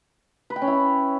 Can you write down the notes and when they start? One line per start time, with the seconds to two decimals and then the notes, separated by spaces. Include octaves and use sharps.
0.50 B4
0.56 G5
0.62 C#4
0.68 E4